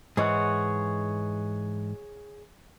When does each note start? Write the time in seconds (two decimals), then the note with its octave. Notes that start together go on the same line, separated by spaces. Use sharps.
0.17 G#2 E3 G#4 C#5 F#5